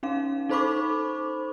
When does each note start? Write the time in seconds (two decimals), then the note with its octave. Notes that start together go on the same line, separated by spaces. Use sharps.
0.03 C#4 D#4 F5
0.49 D#4 A4 C5 B5 C#6 D6